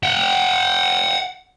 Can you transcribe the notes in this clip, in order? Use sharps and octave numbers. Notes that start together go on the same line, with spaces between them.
F#5 G5